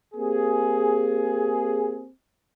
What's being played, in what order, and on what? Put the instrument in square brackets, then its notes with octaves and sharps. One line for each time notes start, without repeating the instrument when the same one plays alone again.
[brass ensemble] A#3 C4 G4 G#4